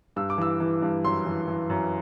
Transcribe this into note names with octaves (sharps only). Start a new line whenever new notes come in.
G2 E6
D6
E3 E6
E3
G2
F#2 C6
E3
E3
F#2